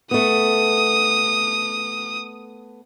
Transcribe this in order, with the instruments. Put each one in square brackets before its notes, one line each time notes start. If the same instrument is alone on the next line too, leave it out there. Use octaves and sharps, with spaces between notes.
[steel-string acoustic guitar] A3 B3 [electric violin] D#6